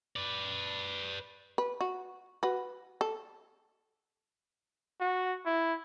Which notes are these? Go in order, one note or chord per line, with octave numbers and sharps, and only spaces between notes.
B4 D5
B4
F#4
F#4 B4
A4
F#4
E4